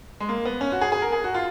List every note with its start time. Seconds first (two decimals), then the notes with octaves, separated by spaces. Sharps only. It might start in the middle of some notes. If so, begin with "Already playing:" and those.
0.20 G#3
0.29 A#3
0.45 B3
0.61 C#4
0.72 F#4
0.81 G#4
0.92 G#4
1.02 A#4
1.12 G#4
1.24 F#4
1.34 F4